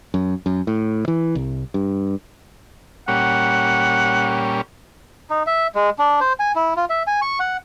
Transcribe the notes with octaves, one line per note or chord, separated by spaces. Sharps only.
F#2
F#2
A2
E3
C2
G2
A#2 G3 C#4 F#5
D#4
E5
G#3
D4
C5
G#5
E4
F4
E5
G#5
C#6
F#5